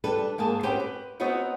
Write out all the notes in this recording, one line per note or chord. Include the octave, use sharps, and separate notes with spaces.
G3 D4 A4 B4
G#2 A#3 G#4 A5
C4 C#4 F#4 G4 B4 C5
B4
B3 C4 D#4 F#4 B4 C#5